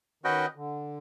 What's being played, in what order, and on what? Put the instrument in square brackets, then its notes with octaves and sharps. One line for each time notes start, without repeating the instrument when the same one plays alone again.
[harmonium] D#3 [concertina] C#4 F#4 B4 D#5 G5
[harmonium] D3